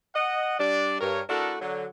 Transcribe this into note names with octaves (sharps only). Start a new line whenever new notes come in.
D#5 F#5
G3 D4 D5
G2 A#4 C#5
A3 D4 E4 F#4 A4 A#4
D3 F#3